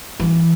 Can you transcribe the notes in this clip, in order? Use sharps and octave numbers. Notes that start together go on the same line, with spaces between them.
E3